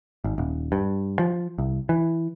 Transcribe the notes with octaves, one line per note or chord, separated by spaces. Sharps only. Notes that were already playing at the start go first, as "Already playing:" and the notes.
G#1
D#1
G2
F3
C2
E3